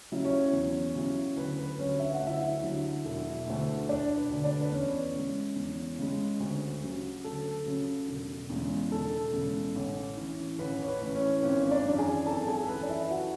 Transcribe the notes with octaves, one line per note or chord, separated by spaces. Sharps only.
C#3 F#3 C#4 E4
C#4 C#5
E2
C#3 F#3 C#4 E4
D2 B4
B4
D3 F#3 C#4 C#5
E5
F#5
D2
E4 E5
D3 F#3
E1
D2 D3 A3
E1 D4 D5
B4
D2 D3 A3
D4 D5
B4
E2 C#4 C#5
C#3 G#3
E2
C#3 G#3
D2
C#3 F#3 C#4
D2 A4
C#3 F#3 C#4
E1
E2 C#3 G#3
E1 A4
E2 C#3 G#3
A1
A2 E3 A3 C#4
A1 B4
C#5
B4
A2 E3 A3 C#4
C#4 C#5
G#1 C#4 C#5
D4 D5
F#2 E3
G#4 G#5
G#1 A4 A5
G#4 G#5
A4
F#2 E3 B4
D5
E4 E5
F#4 F#5